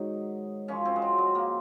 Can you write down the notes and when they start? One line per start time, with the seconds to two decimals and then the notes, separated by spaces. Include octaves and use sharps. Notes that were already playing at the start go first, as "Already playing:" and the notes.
Already playing: G#2 D#3 F#3 D#4
0.68 F#2 F3 C#4
0.85 C4
0.96 G#3
1.02 F#3
1.18 G#3
1.35 A#3